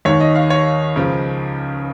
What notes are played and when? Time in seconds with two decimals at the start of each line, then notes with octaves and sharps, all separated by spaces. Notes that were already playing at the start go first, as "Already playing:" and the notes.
0.05 D#2 D#3 C#5
0.20 D#5
0.35 F5
0.50 C#5
0.95 C#2 C#3 F3